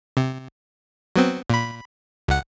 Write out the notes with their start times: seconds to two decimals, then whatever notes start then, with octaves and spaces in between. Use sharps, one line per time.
0.17 C3
1.16 F#3 B3 C4
1.50 A#2 B5
2.28 C#2 F#5